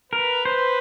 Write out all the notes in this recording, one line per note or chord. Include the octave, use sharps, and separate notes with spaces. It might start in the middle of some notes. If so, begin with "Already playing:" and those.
A#4 B4
B4 C5